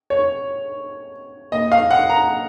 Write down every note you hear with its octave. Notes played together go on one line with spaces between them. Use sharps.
C#5
A#2 D#5
F5
F#5
A#5